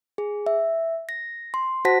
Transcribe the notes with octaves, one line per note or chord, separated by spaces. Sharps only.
G#4
E5
A#6
C6
F#4 C5 F#5 A5 A#6 B6